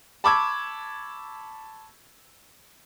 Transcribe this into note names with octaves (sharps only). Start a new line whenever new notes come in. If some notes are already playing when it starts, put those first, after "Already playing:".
A5 B5 C#6 D6 E6 G#6